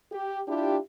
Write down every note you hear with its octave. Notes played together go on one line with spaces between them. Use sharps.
G4
D4 E4 F4 G4